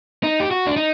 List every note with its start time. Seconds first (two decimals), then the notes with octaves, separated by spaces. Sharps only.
0.23 D#4
0.40 G4
0.51 F#4
0.67 D4
0.77 D#4